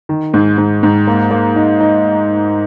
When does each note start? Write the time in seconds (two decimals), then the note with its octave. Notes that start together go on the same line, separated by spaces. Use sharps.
0.09 D#3
0.34 G#2
0.58 G#2
0.83 G#2
1.07 A#3
1.31 A#3
1.56 D#4
1.80 D#4